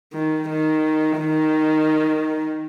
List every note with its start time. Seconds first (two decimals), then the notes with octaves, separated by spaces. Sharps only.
0.14 D#3
0.49 D#3
1.19 D#3